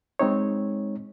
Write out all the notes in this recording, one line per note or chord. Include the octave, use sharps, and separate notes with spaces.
G#3 C4 D#4 C#5